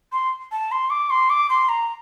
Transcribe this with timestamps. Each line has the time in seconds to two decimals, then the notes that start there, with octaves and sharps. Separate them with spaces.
0.12 C6
0.52 A5
0.72 C6
0.90 D6
1.10 C6
1.30 D6
1.50 C6
1.69 A#5